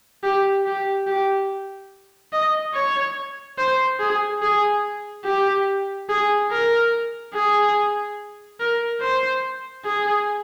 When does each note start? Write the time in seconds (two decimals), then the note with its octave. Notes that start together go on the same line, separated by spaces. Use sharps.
0.23 G4
0.66 G4
1.07 G4
2.33 D#5
2.75 C#5
3.58 C5
3.99 G#4
4.42 G#4
5.25 G4
6.09 G#4
6.51 A#4
7.34 G#4
8.60 A#4
9.01 C5
9.85 G#4